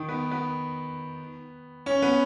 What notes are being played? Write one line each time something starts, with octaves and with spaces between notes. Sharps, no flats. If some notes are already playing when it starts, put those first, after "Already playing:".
Already playing: D#3
B3
B3
C#4
B3